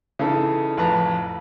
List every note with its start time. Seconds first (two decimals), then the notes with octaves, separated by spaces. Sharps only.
0.19 C#3 E3 D#4 A4
0.77 A1 F2 B4 A5 A#5